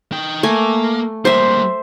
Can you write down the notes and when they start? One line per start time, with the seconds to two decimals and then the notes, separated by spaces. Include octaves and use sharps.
0.12 D#4 G5
0.43 A3 A#3 G#5
1.25 G3 A#3 C5 E5